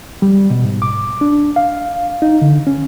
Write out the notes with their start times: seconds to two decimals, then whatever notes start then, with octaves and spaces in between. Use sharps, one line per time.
0.22 G3
0.50 B2
0.64 G#2
0.82 D6
1.21 D4
1.56 F5
2.22 D#4
2.42 D3
2.67 C#4